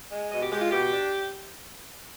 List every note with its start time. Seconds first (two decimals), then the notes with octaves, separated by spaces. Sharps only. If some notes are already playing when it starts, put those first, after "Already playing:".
0.11 G#3
0.30 B2 D#5
0.40 G4
0.50 G#3 G4
0.60 F4
0.70 B2 G4
0.89 D4